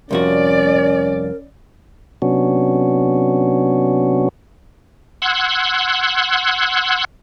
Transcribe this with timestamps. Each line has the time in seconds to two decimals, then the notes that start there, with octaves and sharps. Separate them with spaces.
0.11 C2 F2 C#4 F#4 A#4 D5
2.22 C3 F#3 B3 C#4 D4 F#4
5.22 F#5 C6 E6 F#6 G#6